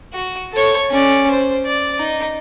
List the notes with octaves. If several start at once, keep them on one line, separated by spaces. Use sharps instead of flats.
F#4
A4 C#5
C#4 D5
C5
D5
D#4